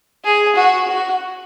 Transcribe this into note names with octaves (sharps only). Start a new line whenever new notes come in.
G#4
F#4
F#4